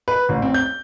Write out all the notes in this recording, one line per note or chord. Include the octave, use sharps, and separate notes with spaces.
B4
A1
C4
G6